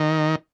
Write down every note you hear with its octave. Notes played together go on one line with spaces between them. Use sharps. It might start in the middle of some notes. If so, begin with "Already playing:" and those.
Already playing: D#3